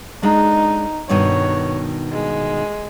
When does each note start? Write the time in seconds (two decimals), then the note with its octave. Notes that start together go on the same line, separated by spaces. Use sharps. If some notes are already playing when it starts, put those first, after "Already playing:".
0.23 G#3 D4 D#4
1.09 G2 B2 D#3 C#5
2.13 G#3